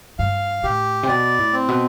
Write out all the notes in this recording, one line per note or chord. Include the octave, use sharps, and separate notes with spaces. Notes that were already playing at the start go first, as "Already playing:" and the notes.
G2 F5
A2 G4
C3
B2 D5
A2
C4
B2